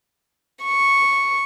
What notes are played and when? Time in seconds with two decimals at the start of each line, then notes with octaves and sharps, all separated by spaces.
0.64 C#6